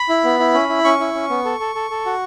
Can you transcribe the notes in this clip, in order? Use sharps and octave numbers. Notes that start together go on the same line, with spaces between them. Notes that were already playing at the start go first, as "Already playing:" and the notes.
Already playing: B5
E4
B3
E4
C#4
E4
C#4 C#6
E4
C#4
B3
A4
A4
A4
A4
F#4